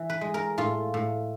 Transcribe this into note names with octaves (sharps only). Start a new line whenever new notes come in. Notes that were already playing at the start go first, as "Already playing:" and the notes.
Already playing: E3
B4
G#3
A#4
A2 F4
A2